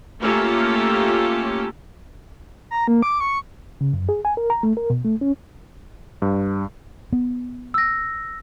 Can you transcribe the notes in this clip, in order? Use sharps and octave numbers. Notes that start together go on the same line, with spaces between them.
A3 A#3 C#4 F4 G4 A4
A#5
A#3
D6
C#6
C#3
F#2
G#4
G#5
A#4
A#5
A3
A#4
B2
A3
C#4
G2
B3
E6 A#6